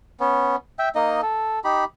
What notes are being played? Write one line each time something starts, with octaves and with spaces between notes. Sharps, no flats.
B3 C#4
E5 G5
A#3 D#4 D#5
A4
D#4 G4 B5